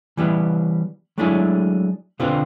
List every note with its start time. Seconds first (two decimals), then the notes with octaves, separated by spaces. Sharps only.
0.17 E3 G3 B3 E4
1.18 F#3 G#3 A3 D4 E4 G#4
2.19 B2 D3 C4 F4 B4 C5